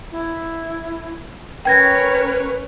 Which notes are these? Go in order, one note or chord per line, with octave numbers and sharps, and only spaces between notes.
E4
C#4 A#4 B4 C#5 G5 G#6 A#6